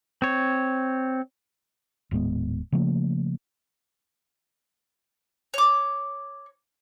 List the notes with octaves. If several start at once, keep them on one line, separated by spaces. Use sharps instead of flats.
C4 C#5
D#1 A2 G#3 B3
C#3 F3 A3 A#3
C#5 D6